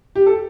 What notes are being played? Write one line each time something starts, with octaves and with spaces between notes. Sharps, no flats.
G4
A4